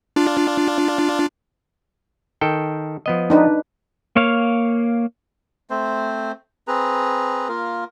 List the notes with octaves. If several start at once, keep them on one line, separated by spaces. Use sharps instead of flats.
D4 F4
D#3 A4 G5
F3 B3 D#5
D4 D#4 B4
A#3 C#5 F5
A3 C4 C5
C4 G#4 B4 A#5
A#3 F4 A#4